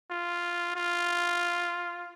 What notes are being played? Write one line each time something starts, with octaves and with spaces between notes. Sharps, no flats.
F4
F4